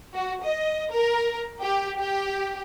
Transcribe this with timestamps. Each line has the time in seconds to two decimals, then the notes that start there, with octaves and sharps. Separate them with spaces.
0.14 F#4
0.44 D#5
0.91 A#4
1.61 G4
1.98 G4